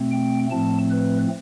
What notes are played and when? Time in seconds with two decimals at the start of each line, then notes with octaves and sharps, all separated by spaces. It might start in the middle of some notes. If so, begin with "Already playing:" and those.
Already playing: B2 A3 C4
0.11 G5
0.51 A2 F3 A3 C4 A5
0.90 B4